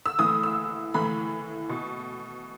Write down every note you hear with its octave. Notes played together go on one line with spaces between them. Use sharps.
E6
A2 E3 D#6
E6
A2 E3 B5
B2